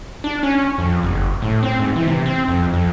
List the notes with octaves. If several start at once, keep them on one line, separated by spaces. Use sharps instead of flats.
D4
C#4
F2
F#1
A2
C4
G#2
E3
C3
C4
F2
F2